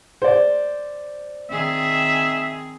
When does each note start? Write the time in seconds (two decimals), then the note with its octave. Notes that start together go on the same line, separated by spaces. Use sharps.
0.22 C5 D5
1.50 D#3 C4 G#4 E5